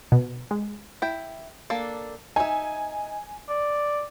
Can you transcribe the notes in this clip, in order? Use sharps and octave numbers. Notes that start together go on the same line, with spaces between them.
B2
G#3
E4 G5
A#3 D4 A4
D#4 E5 G#5
D5